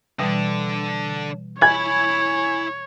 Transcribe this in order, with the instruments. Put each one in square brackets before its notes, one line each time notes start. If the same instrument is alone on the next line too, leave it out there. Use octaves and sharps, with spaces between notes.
[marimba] B2 E3 G3 [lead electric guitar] D3 D4
[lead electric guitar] E4 B5 [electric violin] C#5 [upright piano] G#5 G#6